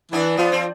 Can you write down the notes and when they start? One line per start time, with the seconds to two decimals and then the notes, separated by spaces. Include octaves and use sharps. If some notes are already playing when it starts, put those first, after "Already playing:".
0.12 E3 B3 D4
0.37 F3 B3
0.52 C4